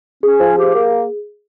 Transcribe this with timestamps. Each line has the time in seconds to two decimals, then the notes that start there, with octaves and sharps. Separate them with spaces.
0.23 C#4 G#4
0.40 F3
0.56 G4
0.73 A#3